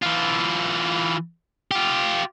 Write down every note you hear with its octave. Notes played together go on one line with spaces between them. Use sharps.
E3 F4
F4 G4